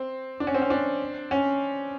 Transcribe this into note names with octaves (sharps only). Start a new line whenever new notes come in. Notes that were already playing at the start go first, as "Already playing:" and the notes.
Already playing: C4
D4
C#4
C4
C#4
C4 D4
C#4